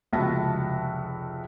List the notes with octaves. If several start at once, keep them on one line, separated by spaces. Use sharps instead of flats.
F1 C#2 F#4 E5 A5 A#6